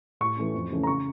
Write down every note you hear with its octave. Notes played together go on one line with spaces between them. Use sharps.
A2 C#6
E3 A3 C#4
F2
C#3 E3 A3 C#4
A#5
C#3 C#6